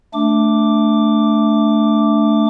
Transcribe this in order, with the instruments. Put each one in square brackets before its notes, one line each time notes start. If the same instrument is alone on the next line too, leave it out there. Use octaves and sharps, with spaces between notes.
[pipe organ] A3 D4 D6